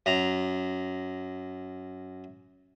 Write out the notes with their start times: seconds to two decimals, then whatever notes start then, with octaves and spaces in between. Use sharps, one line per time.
0.06 F#2 A#5